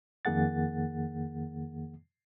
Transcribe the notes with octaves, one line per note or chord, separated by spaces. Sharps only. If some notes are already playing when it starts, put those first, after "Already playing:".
F2 D#3 A#3 G#4 F#5 A6